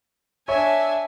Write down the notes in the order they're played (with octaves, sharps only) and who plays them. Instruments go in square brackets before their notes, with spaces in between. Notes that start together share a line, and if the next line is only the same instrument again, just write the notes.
[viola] D4 G#5 [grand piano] C#5 [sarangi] E5